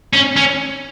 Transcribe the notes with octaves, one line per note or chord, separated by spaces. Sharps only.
C#4
C#4